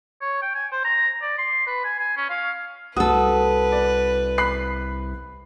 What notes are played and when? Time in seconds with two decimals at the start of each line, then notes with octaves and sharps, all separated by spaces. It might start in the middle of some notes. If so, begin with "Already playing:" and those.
0.21 C#5
0.42 G5
0.55 G#5
0.72 C5
0.84 A#5
1.22 D5
1.38 C6
1.67 B4
1.84 G#5
1.99 G#5
2.17 C#4
2.30 F5
2.97 C2 F#4 A4 B4 D#6
3.72 D5
4.38 B5 F#6 C7